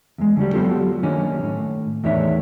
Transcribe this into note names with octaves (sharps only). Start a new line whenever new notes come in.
E2 G#3
D3 F#3 G3
F#3 B3 F4 G4 A4
D#3 A#3 C#4 D4
A2
E2 A2 D#3 D4 C#5 E5